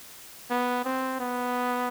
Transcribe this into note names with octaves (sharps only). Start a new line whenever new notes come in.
B3
C4
B3